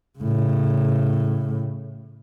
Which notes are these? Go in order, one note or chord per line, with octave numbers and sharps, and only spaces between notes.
A2 C#3